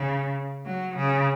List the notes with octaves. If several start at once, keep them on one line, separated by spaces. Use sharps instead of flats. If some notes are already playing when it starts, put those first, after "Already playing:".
Already playing: C#3
F#3
C#3